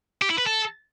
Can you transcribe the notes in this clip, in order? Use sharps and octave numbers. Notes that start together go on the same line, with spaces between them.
G4
E4
B4
A4